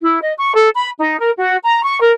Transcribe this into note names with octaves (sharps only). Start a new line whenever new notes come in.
E4
D#5
C#6
A4
B5
D#4
A#4
F#4
A#5
C#6
A#4